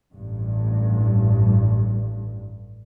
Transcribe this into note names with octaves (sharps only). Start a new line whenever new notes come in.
A1 G2